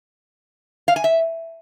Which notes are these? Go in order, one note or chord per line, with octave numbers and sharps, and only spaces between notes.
F5
G#5
E5